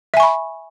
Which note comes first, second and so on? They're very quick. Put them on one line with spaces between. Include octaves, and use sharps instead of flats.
E5 G#5 C#6 B5